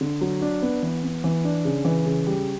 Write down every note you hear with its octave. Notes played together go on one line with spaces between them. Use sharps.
D3
F#3
D4
B3
E3
B3
E3
D4
C#3
E3
C#3
G3